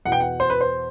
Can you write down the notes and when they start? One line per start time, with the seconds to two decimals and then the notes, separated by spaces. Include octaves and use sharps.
0.05 E2 B2 F#5
0.12 G5
0.20 F#5
0.40 C5
0.50 B4
0.61 C5